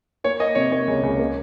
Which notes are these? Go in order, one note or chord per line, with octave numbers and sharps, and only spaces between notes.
A#3 C#5
A#3 D#5
C3 C#5
A#3 C#5
C#2
C#2
A#3